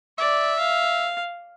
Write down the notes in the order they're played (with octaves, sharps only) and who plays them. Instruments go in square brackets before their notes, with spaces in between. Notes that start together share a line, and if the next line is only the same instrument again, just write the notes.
[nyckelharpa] D5 [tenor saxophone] E5
[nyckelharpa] F5